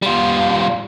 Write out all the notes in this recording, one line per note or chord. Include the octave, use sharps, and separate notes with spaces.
G3 F4